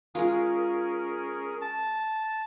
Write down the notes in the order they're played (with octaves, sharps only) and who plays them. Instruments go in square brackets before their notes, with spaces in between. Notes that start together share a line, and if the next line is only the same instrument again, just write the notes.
[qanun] G#3 F4 [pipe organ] C#4 G#4 A#4
[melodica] A5